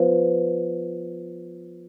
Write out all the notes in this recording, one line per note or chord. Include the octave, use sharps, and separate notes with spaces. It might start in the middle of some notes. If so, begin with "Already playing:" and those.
Already playing: F3 B3